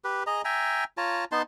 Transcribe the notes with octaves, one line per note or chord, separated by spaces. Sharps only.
G4 B4
G#4 D#5 A#5
E5 G5 G#5 A#5
F4 C#5 A5 A#5
B3 D#4 A5 C6